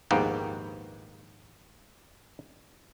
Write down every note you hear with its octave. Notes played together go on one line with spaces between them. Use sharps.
A#1 D#2 G#2 A#3 B3 G5